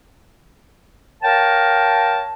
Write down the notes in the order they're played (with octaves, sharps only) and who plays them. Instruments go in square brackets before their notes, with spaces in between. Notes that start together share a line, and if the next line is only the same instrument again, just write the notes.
[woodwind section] A#4 C#5 F5 G5 A5